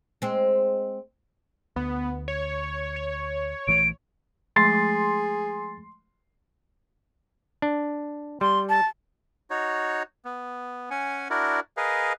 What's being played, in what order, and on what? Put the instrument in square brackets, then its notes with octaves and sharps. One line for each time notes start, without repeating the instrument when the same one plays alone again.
[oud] G#3 C4
[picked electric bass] D2 [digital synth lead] B3
[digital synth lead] C#5
C#5
[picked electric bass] A#1 E3 A3 [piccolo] D7
[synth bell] F3 G#3 A3 [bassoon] G#4 [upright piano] C6 [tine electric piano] A6 C7
[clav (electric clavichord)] D4
[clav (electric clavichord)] G3 [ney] C6
[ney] A5
[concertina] D#4 F#4 C#5
B3
C#4 F#5 G#5
D4 E4 F#4 A#4 D5
G#4 A#4 B4 D#5 F5